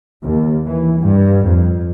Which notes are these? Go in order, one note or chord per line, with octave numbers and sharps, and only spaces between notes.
D#2
E3
G2
F2